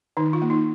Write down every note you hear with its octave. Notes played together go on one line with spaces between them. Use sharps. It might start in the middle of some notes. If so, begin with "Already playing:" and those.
D#3 D#4
F4
A#3
D#4